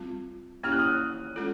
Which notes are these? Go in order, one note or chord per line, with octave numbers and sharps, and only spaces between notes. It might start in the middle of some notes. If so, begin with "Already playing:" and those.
Already playing: G3 C4 F4
A#3 C#4 E4 G4 F6
F#6
D#6 F6
G#3 C#4 F4 A4